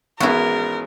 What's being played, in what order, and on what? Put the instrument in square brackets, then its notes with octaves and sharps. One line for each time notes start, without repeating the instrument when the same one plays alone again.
[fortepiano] G#1 B3 [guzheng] E3 G#3 C#4 [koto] E4 F#4 [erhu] A#4